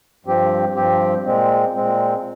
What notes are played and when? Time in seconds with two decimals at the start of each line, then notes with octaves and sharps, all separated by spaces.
0.25 G2 F3 C4 G4
0.75 G2 F3 C4 G4
1.24 A#2 G#3 C4
1.75 A#2 G#3 C4